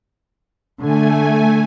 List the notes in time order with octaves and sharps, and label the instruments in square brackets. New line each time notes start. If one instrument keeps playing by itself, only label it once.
[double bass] D3 [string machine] A3 G#5